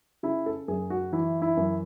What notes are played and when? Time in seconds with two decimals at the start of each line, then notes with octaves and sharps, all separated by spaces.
0.23 C#3 E4
0.46 A4
0.68 F#2 G#4
0.90 F#4
1.12 E3 E4
1.42 E4
1.57 F#2